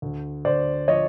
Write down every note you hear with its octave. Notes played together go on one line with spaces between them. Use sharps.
D2
D2 C5 D5
F3 C#5 D#5